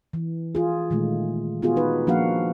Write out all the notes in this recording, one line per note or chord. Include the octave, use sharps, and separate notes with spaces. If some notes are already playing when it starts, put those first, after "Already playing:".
E3
F4 G#4
A#2 D#3 G#3 A3
B3 F4 F#4 G#4
D#4 B4
F3 A#3 D4 F#4 F5 F#5